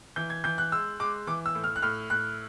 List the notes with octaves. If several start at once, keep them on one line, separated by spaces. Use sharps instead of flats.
E3 G6
G#6
E3 G6
F#6
G#3 E6
G#3 D6
E3 D6
E6
A2
F6
F#6
A2 F6
A2 F#6